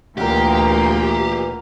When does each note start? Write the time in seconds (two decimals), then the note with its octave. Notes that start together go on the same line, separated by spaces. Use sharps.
0.18 D2 A#2 E3 A#3 G4 A#4 F5 F#5